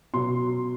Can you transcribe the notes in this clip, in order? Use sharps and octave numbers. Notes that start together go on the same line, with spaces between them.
B2 F#3 C6